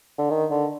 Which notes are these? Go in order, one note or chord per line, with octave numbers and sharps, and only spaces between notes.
D3
D#3
D3